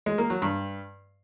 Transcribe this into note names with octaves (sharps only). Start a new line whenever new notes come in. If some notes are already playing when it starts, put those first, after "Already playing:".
G#3
A#3
F#3
G2